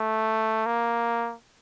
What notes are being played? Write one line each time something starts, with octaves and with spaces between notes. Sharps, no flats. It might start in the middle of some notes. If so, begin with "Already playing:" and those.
Already playing: A3
A#3